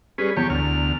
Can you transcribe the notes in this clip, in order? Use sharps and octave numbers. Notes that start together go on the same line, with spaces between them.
G3 C#4 G#4 B4
E2 G4 C#5
D2 F6